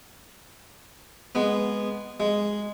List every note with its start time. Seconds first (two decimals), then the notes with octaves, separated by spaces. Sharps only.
1.35 G#3 B3
2.20 G#3